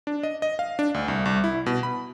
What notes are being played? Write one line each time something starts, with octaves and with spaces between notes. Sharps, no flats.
D4
D#5
D#5
F5
D4
D2
C2
C2
E4
B2
B5